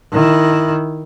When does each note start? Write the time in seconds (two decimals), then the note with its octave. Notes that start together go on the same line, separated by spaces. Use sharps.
0.12 D#3 E4